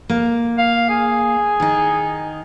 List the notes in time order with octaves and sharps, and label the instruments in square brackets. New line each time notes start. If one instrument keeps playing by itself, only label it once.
[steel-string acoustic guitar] A#3
[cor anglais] F5
G#4
[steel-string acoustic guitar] D#3 D#4